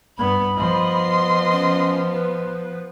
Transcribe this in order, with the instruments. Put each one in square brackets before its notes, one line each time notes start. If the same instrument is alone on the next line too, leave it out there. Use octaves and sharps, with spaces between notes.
[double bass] G2 B3 [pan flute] B5
[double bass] F3 B3 [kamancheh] D#5 C6
[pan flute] C#4
B4